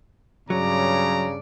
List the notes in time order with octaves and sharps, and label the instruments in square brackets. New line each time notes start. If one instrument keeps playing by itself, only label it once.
[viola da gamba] G2 D5 [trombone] C#3 [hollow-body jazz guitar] F#3 [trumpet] A#5